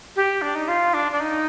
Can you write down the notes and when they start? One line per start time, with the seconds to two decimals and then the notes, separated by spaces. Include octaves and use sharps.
0.16 G4
0.42 D4
0.55 D#4
0.68 F4
0.94 D4
1.12 D4
1.20 D#4